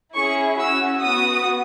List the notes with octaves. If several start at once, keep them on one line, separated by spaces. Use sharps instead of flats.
C#4 E4 G#4 C#6
C#4 F#4 E6
B3 F#4 D#6